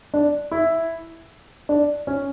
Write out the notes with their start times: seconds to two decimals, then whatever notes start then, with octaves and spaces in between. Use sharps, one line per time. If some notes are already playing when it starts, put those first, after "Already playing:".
0.14 D4
0.52 E4
1.69 D4
2.07 C#4